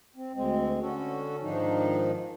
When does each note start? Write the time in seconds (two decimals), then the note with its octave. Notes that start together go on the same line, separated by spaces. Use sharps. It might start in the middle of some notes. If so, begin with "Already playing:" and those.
0.16 C4
0.34 D2 G#3 C4
0.81 D3 C#4 F#4 A4
1.42 G#2 D#3 F3 D4 D#4